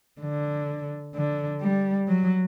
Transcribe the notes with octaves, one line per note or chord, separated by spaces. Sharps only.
D3
D3
G3
F#3